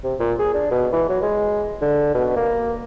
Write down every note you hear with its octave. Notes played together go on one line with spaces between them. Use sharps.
C3
A#2
G#4
D4
B2
E3
F#3
G#3
D3
B2
A#3